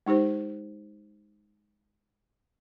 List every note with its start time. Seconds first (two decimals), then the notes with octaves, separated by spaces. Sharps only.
0.06 G#3 D#4 G4 C5